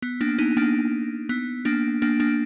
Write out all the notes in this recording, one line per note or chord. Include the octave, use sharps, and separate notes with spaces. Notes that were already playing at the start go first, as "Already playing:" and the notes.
B3
A#3 D4
B3 D#4
A#3 D4
B3
A#3 D4
A#3 D4
A#3 D4